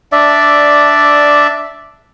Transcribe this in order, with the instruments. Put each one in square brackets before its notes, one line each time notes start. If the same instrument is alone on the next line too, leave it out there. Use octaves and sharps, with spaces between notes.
[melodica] D4 D5 E5